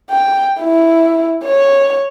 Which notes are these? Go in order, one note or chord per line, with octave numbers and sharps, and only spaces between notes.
G5
E4
C#5